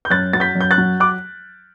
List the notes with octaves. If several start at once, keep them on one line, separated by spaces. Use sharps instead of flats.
G6
F#2 F#6 A6
F#3 A6
G6 B6
F#2
G6
F#6 A6
F#3
D6 F#6